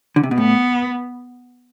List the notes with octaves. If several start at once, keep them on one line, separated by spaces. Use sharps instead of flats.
D3
C3
B2
A2 B3